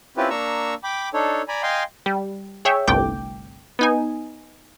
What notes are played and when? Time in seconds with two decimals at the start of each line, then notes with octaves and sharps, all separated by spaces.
0.17 C4 C#4 E4 F4 G4 B4
0.30 A#3 D4 A#5 C#6 E6
0.84 G5 B5 D6
1.14 D4 D#4 A4 C#5
1.48 D5 G#5 A#5 B5
1.63 D#5 F5 G5 G#5 C6
2.06 G3
2.65 G#4 C#5 E5 G5
2.88 G1 C2 G2 A3 G5 D6
3.79 B3 D#4 G#5